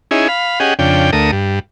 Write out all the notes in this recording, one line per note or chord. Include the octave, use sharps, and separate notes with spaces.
C#4 D#4 E4 G#4
F5 B5
C#4 G4 G#4 D#5 F#5
F2 C#3 D4 G5
D2 A3 A#4 D#6
G2